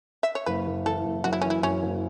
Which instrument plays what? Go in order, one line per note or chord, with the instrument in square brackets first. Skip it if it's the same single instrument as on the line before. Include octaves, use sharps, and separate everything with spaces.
[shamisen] E5
C#5
[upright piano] F#1 [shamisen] B4
[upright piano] F#1
[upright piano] E3 [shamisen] A4
[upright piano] F#1
[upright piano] F#2 [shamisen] F#4
[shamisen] E4
[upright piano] E3 [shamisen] C#4
[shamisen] E4
[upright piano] F#2 [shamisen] C#4
[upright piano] F#1